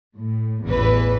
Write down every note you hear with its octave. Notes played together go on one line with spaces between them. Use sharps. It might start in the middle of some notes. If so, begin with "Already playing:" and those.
A2
A1 E2 E3 B4